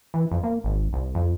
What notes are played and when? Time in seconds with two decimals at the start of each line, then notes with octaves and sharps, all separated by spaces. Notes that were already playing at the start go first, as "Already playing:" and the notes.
0.14 E3
0.31 F2
0.43 A#3
0.64 G#1
0.93 C2
1.15 F2